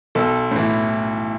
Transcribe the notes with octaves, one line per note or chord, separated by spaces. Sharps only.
B1 A4
A2 E3